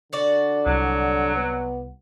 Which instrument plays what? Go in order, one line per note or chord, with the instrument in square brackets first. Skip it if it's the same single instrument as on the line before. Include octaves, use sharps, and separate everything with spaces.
[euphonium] D3 [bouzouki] F#4 D5
[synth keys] C2 [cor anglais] F#3
[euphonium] B3